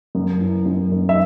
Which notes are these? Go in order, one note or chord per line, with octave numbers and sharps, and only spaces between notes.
F#2
E3
F#2
F#2
E5